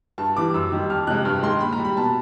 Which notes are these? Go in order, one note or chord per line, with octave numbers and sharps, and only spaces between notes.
G2 A5
E3 G3 D6
F#2 E6
D#3 G3
F2 F6
C3 F3 G#3 F#6
G2 F6
D#3 G#3 C6
A#2 B5
A#5
G3
B5
B2 A5